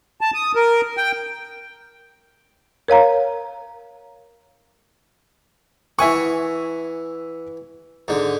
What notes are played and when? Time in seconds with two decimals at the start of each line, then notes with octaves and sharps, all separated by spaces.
0.21 A5
0.34 D#6
0.55 A#4
0.97 G5
2.88 A#4 C#5 F5 A#5
5.99 E3 E5 F#5 G#5 C#6
8.08 G#2 D3